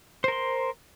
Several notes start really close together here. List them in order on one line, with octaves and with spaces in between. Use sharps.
C5 A#4 C6